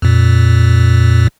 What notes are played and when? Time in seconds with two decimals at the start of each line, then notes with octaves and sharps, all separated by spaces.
0.02 F2 A#2